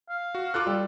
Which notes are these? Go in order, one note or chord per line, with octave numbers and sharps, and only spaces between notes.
F5
F#4
F4 A4 D6 E6 F#6
G3